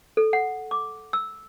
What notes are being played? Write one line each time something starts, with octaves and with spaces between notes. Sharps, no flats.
A4
F#5
D6
E6